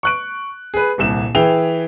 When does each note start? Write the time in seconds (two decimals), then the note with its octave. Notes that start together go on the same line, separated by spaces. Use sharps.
0.03 C#6 F#6 D7
0.74 G#4 B4
0.98 D#1 C2 E7
1.35 E3 E4 G#4 G5 F7